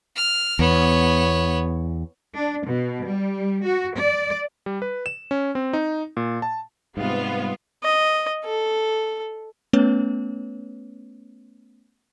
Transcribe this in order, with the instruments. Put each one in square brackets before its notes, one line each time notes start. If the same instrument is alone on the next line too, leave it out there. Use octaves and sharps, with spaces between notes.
[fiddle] F6
[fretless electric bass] E2 [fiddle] B3 C#5
[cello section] D4
B2
G3
F#4
D5
[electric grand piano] G3
B4
E7
C#4
C4
D#4
A#2
A5
[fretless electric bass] G#2 C3 [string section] G3 B3 F4
[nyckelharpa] D#5
A4
[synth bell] A3 B3 C#4 B4 C#5